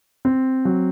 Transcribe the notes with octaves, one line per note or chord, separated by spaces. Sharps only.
C4
F#3